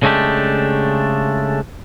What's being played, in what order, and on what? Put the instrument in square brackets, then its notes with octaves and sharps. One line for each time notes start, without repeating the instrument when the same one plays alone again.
[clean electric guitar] C#3 G#3 A3 D4 G4